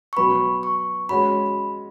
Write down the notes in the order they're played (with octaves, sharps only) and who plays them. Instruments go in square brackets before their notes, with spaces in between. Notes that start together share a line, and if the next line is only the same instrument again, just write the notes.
[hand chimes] C#6
[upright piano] B2 F#3 B3 [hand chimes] B5
[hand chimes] C#6
[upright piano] G#3 C#4 F#4 [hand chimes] B5